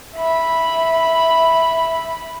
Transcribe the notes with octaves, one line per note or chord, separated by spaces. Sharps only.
E5 B5